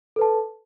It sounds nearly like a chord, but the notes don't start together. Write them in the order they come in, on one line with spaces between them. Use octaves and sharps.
A4 B4 A5